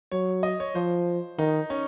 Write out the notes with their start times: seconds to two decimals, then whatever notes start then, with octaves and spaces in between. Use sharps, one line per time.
0.12 F#3 C#5
0.43 D#5
0.60 C#5
0.75 F3 C5
1.39 D#3 D#4
1.70 C#4